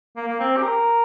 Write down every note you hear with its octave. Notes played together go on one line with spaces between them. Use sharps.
A#3
A#3
C4
G4
A#4